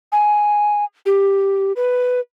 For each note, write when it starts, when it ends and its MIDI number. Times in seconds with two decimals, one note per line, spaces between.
0.12 0.85 80
1.06 1.72 67
1.76 2.20 71